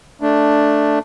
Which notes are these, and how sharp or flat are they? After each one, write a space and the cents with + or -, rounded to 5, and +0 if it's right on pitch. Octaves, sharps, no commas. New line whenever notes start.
A3 +0 D4 +0